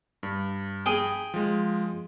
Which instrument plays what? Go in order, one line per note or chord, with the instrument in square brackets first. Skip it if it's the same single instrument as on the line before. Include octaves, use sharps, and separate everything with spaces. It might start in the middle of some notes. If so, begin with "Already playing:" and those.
[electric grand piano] G2
[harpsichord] G#4 G5
[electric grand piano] F3 G#3